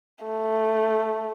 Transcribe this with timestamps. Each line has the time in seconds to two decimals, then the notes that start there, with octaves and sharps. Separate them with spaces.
0.25 A3